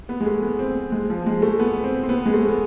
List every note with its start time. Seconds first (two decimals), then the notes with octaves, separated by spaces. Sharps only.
0.09 B3
0.21 G#3
0.26 A3
0.42 B3
0.59 C4
0.92 G#3
1.10 F3
1.26 G#3
1.42 A3
1.59 B3
1.84 C4
2.03 C4
2.09 B3
2.26 G#3
2.34 A3
2.49 B3